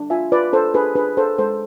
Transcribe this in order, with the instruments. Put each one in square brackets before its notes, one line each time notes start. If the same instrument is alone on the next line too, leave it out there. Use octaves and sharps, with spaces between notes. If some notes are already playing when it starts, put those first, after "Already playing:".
Already playing: [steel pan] D4
F4 E5 G#5
F4 B4 D5
D4 A4 C5
D4 G#4 B4
D4 G#4 B4
D4 A4 C5
G#3 A4 C5